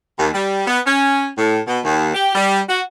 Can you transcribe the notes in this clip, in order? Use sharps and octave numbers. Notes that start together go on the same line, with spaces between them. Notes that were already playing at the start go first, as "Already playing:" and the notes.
D#2
G3
B3
C#4
A2
B2
D#2
G4
G3
F#4